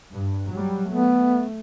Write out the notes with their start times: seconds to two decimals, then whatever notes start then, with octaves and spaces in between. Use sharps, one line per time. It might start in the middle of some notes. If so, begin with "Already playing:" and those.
0.12 G2
0.52 F#3 G3
0.91 A3 B3